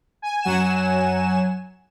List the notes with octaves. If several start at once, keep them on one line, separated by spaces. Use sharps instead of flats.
G#5
F#2 F#3 F#5 G#5 E7